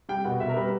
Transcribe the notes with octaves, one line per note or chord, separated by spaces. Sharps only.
G3 G5
B2 F#5
B2 E5
A#4
G3 B4